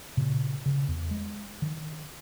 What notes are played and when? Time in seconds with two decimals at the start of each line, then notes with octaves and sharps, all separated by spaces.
0.17 A#2 C#3
0.66 C#3
0.88 E2
1.11 G#3
1.62 D#3